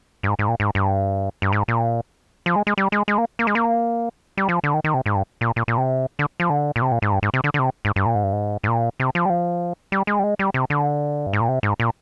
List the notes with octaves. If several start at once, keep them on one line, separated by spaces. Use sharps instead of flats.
G2
G#2
G#2
A#2
G#2
G2
G2
G#2
A#2
F3
G#3
G#3
G3
G#3
G#3
A#3
A#3
G#3
A#3
G3
F3
D3
D#3
D#3
C3
G#2
G2
A#2
A#2
A#2
C3
D3
F3
D3
A#2
C3
A#2
G#2
G2
G#2
C3
D3
D3
C3
G#2
G2
A#2
G#2
G2
G#2
G#2
A#2
C3
F3
G3
F3
G3
G#3
G3
G#3
G3
C3
D3
G2
G#2
A#2
C3
G#2
A#2